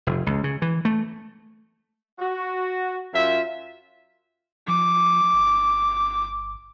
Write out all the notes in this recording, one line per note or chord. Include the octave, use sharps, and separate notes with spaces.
F1
C#2
C#3
E3
A3
F#4
F#2 F4 E5
F3 D6
G1